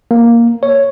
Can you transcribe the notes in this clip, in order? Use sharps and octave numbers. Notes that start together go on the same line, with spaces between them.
A#3
C#5